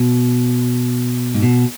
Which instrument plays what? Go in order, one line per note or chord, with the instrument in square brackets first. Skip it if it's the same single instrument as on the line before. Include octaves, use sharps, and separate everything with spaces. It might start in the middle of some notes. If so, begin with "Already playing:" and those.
Already playing: [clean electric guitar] B2
G#2
B2